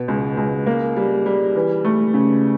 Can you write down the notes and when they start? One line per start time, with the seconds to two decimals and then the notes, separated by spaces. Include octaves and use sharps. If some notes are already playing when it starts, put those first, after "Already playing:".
Already playing: B2
0.08 C#2
0.37 C#2
0.66 A#3
0.96 G3
1.26 G3
1.56 E3
1.85 A3
2.14 C#3